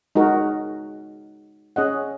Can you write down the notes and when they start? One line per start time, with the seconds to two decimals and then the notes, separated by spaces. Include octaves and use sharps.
0.15 G#3 D#4 F#4 A#4
1.76 C#4 G#4 D#5 F#5